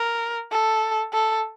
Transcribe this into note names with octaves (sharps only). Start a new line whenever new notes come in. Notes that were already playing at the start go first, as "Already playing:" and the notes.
Already playing: A#4
A4
A4